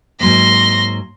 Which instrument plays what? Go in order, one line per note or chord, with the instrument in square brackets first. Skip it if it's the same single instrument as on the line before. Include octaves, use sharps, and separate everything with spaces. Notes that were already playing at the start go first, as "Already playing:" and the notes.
[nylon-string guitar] G#2 F#3 A#3 [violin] C6 A#6